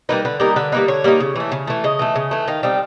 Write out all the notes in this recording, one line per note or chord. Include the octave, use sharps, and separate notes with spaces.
G3 A#3 D#4 B4
D3 B4
G3 A#3 D#4 A#4
D3 B4
G3 A#3 D#4 B4
D3 C#5
G3 A#3 D#4
C#3
E3 A3
C#3
E3 A3
C#3 D#5
E3 A3
C#3
E3 A3
D#3 F5
G3 C4 D#4